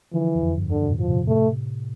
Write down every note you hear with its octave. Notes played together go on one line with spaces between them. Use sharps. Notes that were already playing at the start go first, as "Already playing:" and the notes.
D3 E3 F3
E2
F2
E2 G2
E2 G2 D3
B2
F2 A2
F3
A2 C3
A2 C3 A3